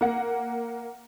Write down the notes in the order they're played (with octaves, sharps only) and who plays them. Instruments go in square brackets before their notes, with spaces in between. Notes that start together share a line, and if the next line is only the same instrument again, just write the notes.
[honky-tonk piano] A#3 F#5